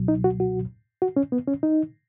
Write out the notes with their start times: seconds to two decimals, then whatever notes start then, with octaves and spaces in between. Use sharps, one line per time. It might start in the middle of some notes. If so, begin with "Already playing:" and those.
Already playing: C#2 B2 F#3
0.08 D#4
0.24 F#4
0.40 F#4
1.02 F#4
1.17 C#4
1.32 B3
1.47 C#4
1.63 D#4